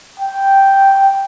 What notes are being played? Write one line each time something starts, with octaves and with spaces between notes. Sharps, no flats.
G5